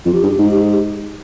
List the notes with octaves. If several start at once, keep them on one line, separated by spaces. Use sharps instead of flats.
F2 F4
G4
G2 G#4
G4
G#2 D#4
G4
G#4
G4